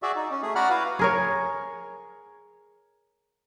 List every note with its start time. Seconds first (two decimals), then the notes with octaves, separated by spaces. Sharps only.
0.02 F#4 G#4 D5 E5
0.16 D#4
0.31 C#4
0.42 A3 G#4
0.55 F#4 D5 F#5 A#5 B5 F6
0.69 E4 F#4 B4 F5
0.99 G#4 A#4 C#5